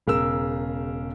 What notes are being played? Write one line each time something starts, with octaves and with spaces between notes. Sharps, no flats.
E1 C#3 A#4 E6